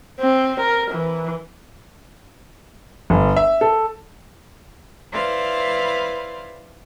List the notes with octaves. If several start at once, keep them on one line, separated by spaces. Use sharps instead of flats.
C4
A#4
E3
G1
E5
A4
E4 B4 C5 D5 F5